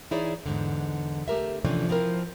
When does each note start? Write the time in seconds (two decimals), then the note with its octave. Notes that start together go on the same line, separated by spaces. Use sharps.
0.11 E3 D#4 E4 G#4 C#5 D5
0.46 E2 G#2 D3
1.28 A3 G4 A#4 E5
1.65 C3 E3 F3 A3 C#4 D4
1.89 F3 C4 E4 A#4